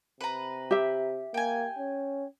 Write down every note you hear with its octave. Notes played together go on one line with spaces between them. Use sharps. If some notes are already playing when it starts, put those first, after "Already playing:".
C3 B4 A#5
G4 E5
A#3 G5 G#5
C#4